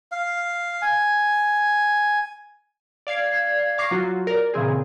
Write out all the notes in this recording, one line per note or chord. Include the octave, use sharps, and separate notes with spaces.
F5
G#5
D5 F5 G#6 C7
F5 C#6 D6 A#6 C7
F#3 F4 F#4
A#4 D5
A#2 C#3 E3 C4 G#4